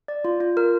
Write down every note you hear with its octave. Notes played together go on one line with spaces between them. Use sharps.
D5
F4
F4
A#4